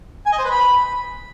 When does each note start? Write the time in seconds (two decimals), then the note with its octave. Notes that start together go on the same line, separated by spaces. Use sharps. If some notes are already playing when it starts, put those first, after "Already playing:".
0.26 G#5
0.32 D#5
0.39 C5
0.45 B4
0.51 B5